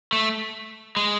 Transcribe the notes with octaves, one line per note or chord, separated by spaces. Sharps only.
A3
G#3